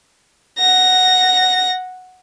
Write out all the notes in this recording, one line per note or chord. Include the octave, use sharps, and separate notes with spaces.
F#5 A#6